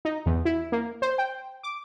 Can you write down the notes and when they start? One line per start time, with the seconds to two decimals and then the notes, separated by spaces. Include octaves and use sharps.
0.05 D#4
0.26 E2
0.45 E4
0.72 A#3
1.02 C5
1.18 G5
1.63 D6